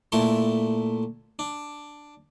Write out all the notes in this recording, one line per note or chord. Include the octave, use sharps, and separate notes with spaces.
A#2 A3 E4 A4 C6
D4